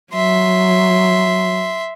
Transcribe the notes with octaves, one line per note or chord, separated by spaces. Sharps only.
F#3 E5 C6